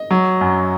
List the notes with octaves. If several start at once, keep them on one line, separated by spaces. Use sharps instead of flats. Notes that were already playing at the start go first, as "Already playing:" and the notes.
Already playing: D#5
F#3
F#2